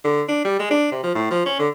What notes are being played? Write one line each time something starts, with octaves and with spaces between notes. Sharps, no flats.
D3
D4
G3
G#3
D4
C3
F3
A2
F3
C#4
D3